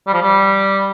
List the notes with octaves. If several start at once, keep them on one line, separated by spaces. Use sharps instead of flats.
G3
F3
G3